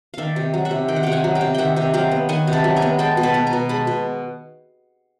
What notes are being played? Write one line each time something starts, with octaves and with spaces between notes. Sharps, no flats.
D#3 D5 E5 F5
C3
F#3
E5 F#5
C3
D#3 G5
F#5
C3 F5 G5
F#5 G#5
F#3
F5 G5
C3
D#3 E5 F#5 G5
C3
F#3 F5 G5
B3
D#3 F#5 G#5
C3
A5 B5
F#3
G#5 A#5
B3
G#3 G5 A5
B2
A5 B5
B3
G#5 A#5
B2
G#3 A5 B5
B2